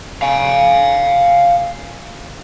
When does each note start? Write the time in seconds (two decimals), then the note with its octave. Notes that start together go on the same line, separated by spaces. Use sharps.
0.22 F5 G#5